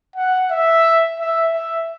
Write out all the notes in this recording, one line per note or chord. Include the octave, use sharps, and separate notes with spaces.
F#5
E5
E5
E5